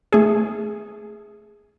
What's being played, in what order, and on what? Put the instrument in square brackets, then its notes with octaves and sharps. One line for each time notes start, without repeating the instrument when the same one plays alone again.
[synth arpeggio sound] A3 G#4